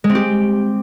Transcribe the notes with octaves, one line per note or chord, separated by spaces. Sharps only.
G#3
C4
G4